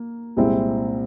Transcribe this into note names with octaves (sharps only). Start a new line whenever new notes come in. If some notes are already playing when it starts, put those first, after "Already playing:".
Already playing: A#3
C2 A#2 G#3 C4 E4